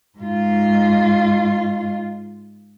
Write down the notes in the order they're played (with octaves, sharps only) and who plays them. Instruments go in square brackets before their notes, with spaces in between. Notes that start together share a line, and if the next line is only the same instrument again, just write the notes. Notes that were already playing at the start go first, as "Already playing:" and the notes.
[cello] G#2 F4